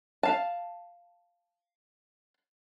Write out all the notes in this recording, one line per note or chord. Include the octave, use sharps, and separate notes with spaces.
F5 A5